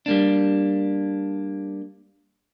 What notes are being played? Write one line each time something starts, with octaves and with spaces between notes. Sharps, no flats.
G3 A#3 D4